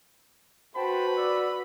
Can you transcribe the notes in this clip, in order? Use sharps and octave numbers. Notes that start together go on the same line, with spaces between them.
F#4 B4 C5 G5 A5 B5
D5 E6